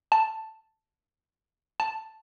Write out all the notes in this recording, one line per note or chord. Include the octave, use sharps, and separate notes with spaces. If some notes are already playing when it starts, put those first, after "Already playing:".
A5
A5